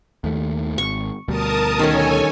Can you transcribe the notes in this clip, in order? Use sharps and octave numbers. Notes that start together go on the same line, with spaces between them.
D#2 D#3 A3
G#1 C#6
D2 B2 G3 A#4 A5 D#6
D#3 C#4 A4 C#5 G#5